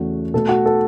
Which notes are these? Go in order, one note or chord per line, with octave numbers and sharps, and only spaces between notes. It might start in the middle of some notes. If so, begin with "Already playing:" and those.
Already playing: E2 C#3 A3 F#4
B2 A3 A4
F#4
A4